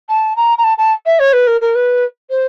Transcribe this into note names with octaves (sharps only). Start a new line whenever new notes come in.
A5
A#5
A#5
A5
A5
E5
C#5
B4
A#4
A#4
B4
C5